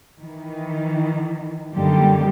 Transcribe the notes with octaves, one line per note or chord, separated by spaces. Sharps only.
D#3 E3
F#2 D3 D#3 G3 A#3 G4